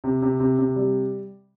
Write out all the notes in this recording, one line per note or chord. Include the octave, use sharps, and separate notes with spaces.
C3
C3
C3
C3
G3